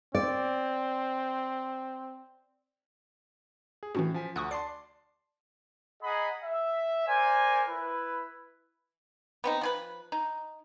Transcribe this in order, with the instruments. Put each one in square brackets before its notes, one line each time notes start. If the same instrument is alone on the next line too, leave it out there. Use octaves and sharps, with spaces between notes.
[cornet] C4 [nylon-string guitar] D5
[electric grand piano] G#4
[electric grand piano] A2 [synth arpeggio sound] E3 C#4 F#4
[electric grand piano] F3 G#5 B6
[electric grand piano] D2 F#5 [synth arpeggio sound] C#6 D#6 F#6
[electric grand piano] D5 A5 C6 [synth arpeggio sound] C7
[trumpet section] G#4 D#5 F#5 A#5 B5
E5
A#4 C5 D5 G#5
E4 B4
[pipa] B3 C4 D#4
F3 G#4 B4
D#4